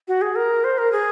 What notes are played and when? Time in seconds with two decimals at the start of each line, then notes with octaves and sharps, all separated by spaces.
0.08 F#4
0.21 G#4
0.36 A#4
0.64 C5
0.78 A#4
0.92 G#4